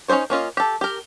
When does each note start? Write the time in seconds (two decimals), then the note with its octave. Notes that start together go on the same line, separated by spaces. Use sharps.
0.08 C#4 D#4 G#4 C5 C#5
0.30 A#3 C#4 F4 D#5
0.57 G4 A4
0.81 G4 A#4